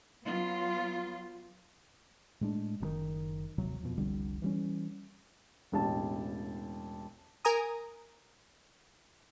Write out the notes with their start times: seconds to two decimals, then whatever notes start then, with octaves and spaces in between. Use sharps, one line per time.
0.24 F#3 B3 F4
2.41 A2 G#3 D4
2.80 F#1 C3 D#3
3.58 G#1 D#2 C3 F#3
3.83 F2 B2
3.97 F1 C2 D3 G3
4.42 E3 G3 C#4
5.72 E1 A1 A5
7.45 A#4 G#5 A#5 D#6